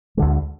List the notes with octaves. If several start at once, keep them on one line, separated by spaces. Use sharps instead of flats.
D2 D3 G#3